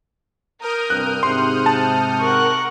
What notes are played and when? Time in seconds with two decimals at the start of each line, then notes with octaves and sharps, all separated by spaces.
0.61 A#4 D#6 F6 G6
0.90 C2 G2 C4 F#6
1.23 G#2 C3 F#5 C6
1.66 A5
2.20 A#4 F#5 C#6 F#6